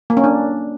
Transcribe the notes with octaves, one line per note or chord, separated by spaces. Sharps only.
A#3
C#4
D4